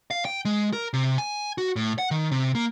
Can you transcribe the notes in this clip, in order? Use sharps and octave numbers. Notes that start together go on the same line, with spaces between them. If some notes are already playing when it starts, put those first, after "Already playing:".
F5
G5
G#3
A#4
C3
G#5
F#4
A2
F#5
D#3
C3
A#3